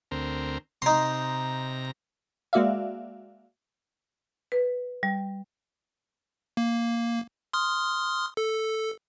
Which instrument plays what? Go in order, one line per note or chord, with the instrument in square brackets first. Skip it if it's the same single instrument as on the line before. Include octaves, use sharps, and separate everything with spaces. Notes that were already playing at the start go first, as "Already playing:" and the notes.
[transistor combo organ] D2 C4 A#4
[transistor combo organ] C3 A#5 [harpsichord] D#4 C6
[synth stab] G#3 A#3 F#4 D5 E5 F5
[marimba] B4
G3
[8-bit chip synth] A#3
C6 D#6 F6
A4